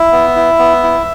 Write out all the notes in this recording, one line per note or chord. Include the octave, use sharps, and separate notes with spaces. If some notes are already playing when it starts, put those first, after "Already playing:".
Already playing: E4 E5
B3
E4
B3
E4